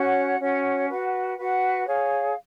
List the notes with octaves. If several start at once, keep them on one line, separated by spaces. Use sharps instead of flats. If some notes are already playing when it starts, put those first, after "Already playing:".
Already playing: C#4 F#4 C#5 F#5
C#4 F#4 C#5 F#5
F#4 B4 F#5
F#4 B4 F#5
G#4 C#5 F5